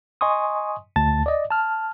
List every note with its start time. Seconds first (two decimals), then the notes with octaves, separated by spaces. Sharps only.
0.21 D#5 G#5 C6 C#6 D#6
0.96 D2 A5 A6
1.26 D5 D#5
1.50 A5 F6